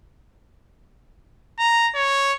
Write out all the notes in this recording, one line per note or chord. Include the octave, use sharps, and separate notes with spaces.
A#5
C#5